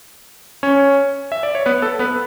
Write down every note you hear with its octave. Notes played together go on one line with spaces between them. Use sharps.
C#4 C#5
E5
D5
C#5
B3 B4
A4
B3 B4